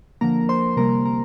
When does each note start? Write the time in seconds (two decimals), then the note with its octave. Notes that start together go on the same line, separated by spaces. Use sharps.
0.21 D3 F3 A#3 A#4 A#5
0.49 C5 C6
0.77 C3 G3 A#3 A#4 A#5
1.05 A#4 A#5